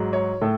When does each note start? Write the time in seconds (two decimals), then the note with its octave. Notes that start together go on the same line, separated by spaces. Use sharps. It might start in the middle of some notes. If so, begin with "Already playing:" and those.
Already playing: G#2 F#3
0.13 C#5
0.41 A2 A4